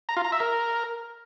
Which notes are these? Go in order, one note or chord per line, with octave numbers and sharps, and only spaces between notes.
A#5
F4
A#5
E5
A#4